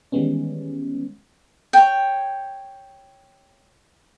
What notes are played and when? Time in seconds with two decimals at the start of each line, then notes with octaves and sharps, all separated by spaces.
0.12 D#3 E3 G3 G#3 B3 C#4
1.73 C#5 G5